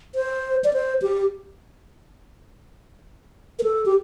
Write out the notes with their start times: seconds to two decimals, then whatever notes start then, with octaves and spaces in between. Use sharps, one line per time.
0.15 C5
0.64 D5
0.73 C5
1.02 G4
3.59 A#4
3.63 A4
3.86 G4